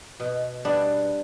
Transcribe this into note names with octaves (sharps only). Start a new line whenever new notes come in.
B2
G3 B3 D4